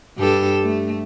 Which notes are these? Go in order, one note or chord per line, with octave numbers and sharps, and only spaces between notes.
G2 G4 A4
A3